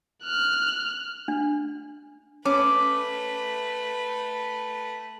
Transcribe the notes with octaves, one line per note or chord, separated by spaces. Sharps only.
F6 F#6
D4
A3 C#4 B4 D6